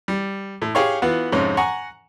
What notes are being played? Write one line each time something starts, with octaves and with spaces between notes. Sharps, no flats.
G3
A2
G4 G#4 C#5 F5 G5 C#6
E3 B3 F4 F#4
F2 G#2 C3 C#4
F#5 G#5 A#5 C#6